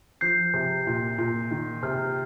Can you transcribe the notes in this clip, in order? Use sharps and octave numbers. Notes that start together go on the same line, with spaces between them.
F3 G6 C7
C3
A#2
A#2
D#3
C3 F6